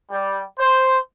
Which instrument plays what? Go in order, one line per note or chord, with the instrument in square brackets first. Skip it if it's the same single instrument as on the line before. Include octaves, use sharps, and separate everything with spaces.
[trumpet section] G3
C5